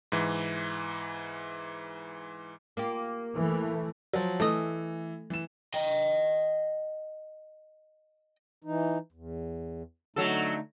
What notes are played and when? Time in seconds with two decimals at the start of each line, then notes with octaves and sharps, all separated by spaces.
0.12 G#2 E3
2.77 A#3 F4 G4
3.35 E3 A3
4.13 F3 F#3
4.40 E3 A3 D#5
5.30 E3 E7
5.74 D#5 G5
8.64 E3 D#4
9.12 E2
10.16 D3 F#3 A3 D#4 A4